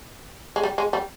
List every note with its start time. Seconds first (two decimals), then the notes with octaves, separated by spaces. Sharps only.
0.56 G#3
0.63 G3
0.78 G#3
0.93 G3